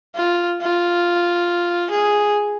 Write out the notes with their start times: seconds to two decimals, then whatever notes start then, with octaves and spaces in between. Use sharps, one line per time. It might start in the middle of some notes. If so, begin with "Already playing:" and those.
0.15 F4
0.62 F4
1.91 G#4